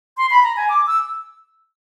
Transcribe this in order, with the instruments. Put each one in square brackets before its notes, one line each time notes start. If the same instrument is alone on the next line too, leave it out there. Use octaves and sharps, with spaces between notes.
[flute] C6
B5
A#5
G#5
D6
E6